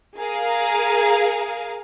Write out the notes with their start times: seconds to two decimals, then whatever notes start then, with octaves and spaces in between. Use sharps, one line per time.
0.18 G#4 A#4 F5